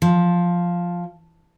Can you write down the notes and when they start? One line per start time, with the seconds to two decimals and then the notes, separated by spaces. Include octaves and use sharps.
0.02 F3